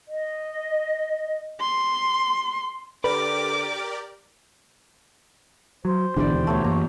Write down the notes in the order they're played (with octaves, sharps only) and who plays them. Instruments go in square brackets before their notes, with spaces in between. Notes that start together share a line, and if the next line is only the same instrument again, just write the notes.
[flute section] D#5
[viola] C6
[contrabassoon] D3 [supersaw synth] G4 A#4 D5 [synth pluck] B4 [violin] D6
[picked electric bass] F#3 [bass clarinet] C5
[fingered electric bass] G#1 G#2 D4 [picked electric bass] B2 D3 E3 [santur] G4 D5
[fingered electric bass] D#2
[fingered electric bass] D2 [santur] A3 B3 C#5
[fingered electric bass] F#2 E3 [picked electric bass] A#3 [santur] A#5